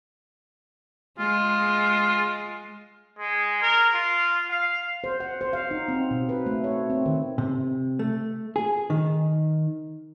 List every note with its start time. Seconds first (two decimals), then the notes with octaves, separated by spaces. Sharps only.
1.19 G#3 F4
3.19 G#3
3.62 A#4
3.95 F4
4.50 F5
5.04 C5
5.20 F#5
5.41 C5
5.53 F5
5.71 D#4
5.88 C4
6.11 B2
6.29 B4
6.46 A3
6.64 C#5
6.90 C4
7.06 D#3
7.38 C3
7.99 A3
8.56 G#4
8.90 D#3